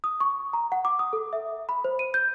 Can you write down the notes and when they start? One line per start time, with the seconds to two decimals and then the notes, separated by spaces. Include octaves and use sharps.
0.04 D#6
0.20 C#6
0.53 A#5
0.72 F#5
0.85 D6
0.99 D#6
1.13 A4
1.33 E5
1.69 B5
1.84 C5
1.99 D#7
2.14 G6